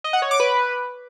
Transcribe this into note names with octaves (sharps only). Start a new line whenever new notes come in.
D#5
F#5
C#5
D6
B4